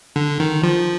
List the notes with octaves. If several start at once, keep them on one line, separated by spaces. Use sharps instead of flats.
D3
D#3
F3